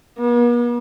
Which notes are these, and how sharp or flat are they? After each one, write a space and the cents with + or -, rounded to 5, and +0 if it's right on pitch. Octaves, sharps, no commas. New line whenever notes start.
B3 -45